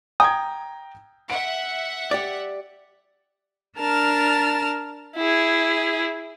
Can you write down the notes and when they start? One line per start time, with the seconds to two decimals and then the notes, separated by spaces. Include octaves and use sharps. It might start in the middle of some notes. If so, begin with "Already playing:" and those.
0.20 G5 A#5 D#6 G#6
1.30 E5 F#5 D7
2.11 G4 D5
3.78 D4 A#4 A5 F6
5.17 E4 G#4